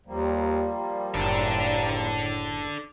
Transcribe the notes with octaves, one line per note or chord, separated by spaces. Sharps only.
D#2 F3 G3 A#3
F#1 A2 D4 A4